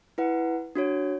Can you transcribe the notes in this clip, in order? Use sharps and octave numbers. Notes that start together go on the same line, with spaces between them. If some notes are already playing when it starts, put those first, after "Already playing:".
E4 B4 F#5
D4 F#4 C#5